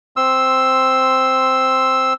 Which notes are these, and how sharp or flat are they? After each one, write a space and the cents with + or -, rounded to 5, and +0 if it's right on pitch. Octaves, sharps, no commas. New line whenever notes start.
C4 +0 C6 +5 E6 +0